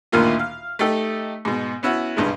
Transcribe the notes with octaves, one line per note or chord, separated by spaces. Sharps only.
A1 D2 A#2 D#3 A#3 F4
F5
A3 D#4 G4 A4
G#2 B2
B3 C#4 E4 F#4
B1 G2 C#3 G#3